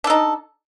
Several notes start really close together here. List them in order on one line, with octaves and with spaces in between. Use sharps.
D4 A4 D#4